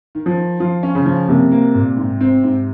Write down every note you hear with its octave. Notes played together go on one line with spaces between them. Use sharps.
D#3
F3
D#3
F3 F4
C#4
C#3
F3
C3 A#3
A#3
A#2
G#2
C4
G#2